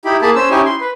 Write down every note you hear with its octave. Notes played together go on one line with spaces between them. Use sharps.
D#4 E4 G4 B5
A#3 G#4 A5 B5
C#4 C5 E6
C#4 D#4 E4 G4 C#5 G#5
C6
B4